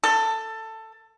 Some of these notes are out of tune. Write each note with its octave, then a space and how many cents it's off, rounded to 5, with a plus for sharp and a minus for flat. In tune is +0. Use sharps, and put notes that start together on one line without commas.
A4 +15